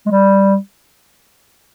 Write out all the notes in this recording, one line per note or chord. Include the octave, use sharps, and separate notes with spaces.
G#3
G3